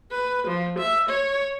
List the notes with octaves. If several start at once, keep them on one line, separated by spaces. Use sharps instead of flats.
B4
F3
E5
C#5